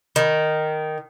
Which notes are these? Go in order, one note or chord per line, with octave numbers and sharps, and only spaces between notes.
D#3